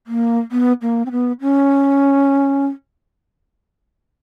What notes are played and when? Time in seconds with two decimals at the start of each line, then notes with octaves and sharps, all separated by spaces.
0.07 A#3
0.52 B3
0.82 A#3
1.06 C4
1.12 B3
1.41 C#4